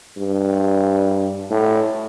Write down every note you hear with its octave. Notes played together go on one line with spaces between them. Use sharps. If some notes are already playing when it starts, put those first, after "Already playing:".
G2
A2